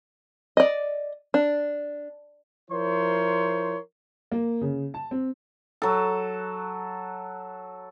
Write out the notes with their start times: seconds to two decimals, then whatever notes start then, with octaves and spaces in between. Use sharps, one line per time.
0.57 D5 D#5
1.34 D4
2.71 F3 E4 A#4 C5 C#5 C6
4.31 A#3
4.61 C#3
4.94 A5
5.11 C4
5.82 F#3 A4